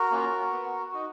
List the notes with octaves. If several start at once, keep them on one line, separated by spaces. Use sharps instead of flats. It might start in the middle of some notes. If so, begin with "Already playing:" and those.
Already playing: F#4 A#4
A#3 C#4 F4
B3
D#4 F#4